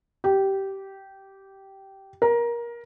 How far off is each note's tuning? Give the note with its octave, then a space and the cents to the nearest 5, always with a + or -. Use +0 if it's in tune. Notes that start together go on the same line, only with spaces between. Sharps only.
G4 -15
A#4 +20